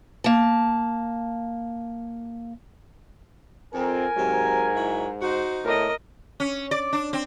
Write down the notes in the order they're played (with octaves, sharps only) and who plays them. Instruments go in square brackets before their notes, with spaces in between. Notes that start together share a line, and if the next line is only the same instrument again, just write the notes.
[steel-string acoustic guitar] A#3 A5
[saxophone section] F2 [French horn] C4 [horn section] A#4 G#5
[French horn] G#2 [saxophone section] C3 F#3
[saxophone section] F#3 E4
[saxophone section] D#4 F#4 [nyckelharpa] C5
[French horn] A2 [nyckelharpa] A#4 D#5
[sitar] C#4
D5
D4
C4